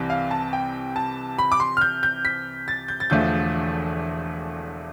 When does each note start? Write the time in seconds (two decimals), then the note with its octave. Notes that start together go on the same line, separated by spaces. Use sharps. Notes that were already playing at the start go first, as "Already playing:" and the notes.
Already playing: C2 C3 E3
0.10 F5
0.31 A5
0.53 G5
0.96 A5
1.38 B5
1.52 D6
1.60 C6
1.77 F6
1.81 G6
2.03 G6
2.25 B6
2.68 A6
2.88 G6
3.00 A6
3.10 E1 E2 D3 F3 A3 G6